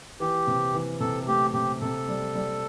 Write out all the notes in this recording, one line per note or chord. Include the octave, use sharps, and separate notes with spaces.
E3 G4
C3
E3
C3 A4
A3 G4
C3 G4
C3 A4
G3
G3